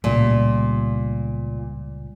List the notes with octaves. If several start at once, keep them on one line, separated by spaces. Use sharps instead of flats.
C#2 A#2 G3 A3